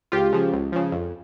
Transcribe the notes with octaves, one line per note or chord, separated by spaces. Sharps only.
C#2 F4 G4
C#3 F3
C#2
C#3 F3
F2